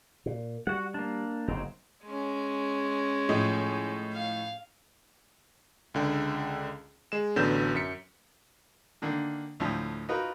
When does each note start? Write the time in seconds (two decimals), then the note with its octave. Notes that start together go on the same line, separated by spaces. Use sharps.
0.26 A#2
0.67 G3 F#4 F#5
0.94 A#3 D4
1.48 F#1 F#3 C4 D#4
2.06 G#3 C#4
3.29 A2 F3 D#5
4.14 F5
5.94 C#2 D3 G5
7.12 G#3 E7
7.36 A1 D3 F#3 B3 G6 E7
7.75 F#2 B6 C#7
9.02 D3 D#3 A#3
9.60 D2 A2 F3
10.09 D#4 F4 F#4 A#4 B4